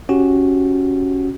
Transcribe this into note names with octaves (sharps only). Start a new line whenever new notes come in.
C#4 F#4 G4